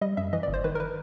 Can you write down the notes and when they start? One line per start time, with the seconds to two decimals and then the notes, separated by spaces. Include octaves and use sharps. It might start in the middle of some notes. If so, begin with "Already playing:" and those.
0.01 G3 D#5
0.17 F#2 E5
0.33 E3 D#5
0.43 D5
0.48 G1
0.54 C5
0.64 D#3 B4
0.75 A#4
0.80 B4